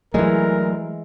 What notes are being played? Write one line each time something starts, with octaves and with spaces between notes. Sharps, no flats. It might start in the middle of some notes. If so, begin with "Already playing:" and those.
E3 F#3 G#3 A3 A#4